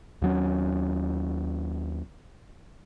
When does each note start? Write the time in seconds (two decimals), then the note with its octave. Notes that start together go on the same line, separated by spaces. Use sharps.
0.22 D#2 F#3 C#4